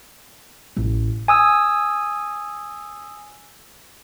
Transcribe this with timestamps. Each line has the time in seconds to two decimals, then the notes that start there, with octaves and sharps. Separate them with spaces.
0.77 A1
1.28 G#5 D#6 E6